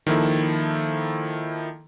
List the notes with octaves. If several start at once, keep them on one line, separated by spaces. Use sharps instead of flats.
D#3 F3 A#3 E4 A4